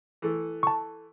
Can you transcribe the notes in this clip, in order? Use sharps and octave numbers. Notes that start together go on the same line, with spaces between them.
E3 A3 A4
A5 C#6